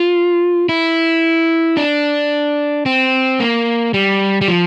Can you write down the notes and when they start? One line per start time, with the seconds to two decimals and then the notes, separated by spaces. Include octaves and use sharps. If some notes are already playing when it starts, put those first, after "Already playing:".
Already playing: F4
0.69 E4
1.77 D4
2.86 C4
3.40 A#3
3.94 G3
4.41 G3
4.48 F3